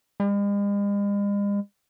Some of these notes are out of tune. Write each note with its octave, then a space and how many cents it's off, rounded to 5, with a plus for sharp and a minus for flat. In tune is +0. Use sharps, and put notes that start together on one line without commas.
G#3 -45